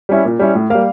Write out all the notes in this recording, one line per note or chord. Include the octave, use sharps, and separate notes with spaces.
G3 C#4 E4
A#2
G3 C#4 E4
A2
G3 A#3 F5